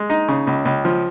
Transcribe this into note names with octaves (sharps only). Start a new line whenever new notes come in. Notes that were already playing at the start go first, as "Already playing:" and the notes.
Already playing: G#3
D#4
C#3
C#2
C#2
F3